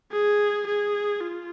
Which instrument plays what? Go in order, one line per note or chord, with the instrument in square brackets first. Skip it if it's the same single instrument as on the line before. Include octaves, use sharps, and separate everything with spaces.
[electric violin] G#4
G#4
F4